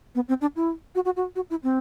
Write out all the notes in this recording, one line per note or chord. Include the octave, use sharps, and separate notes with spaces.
B3
C4
D4
E4
F#4
F#4
F#4
F#4
E4
C4